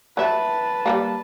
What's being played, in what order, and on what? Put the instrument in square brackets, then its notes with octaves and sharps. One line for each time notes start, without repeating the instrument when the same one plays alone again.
[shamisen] F#3 E5 [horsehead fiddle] B4 A5
[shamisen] G3 G#3 A#3